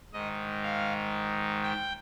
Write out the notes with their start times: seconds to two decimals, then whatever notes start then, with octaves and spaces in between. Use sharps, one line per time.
0.13 G#2 D#3 D#5
0.63 F5
1.63 G5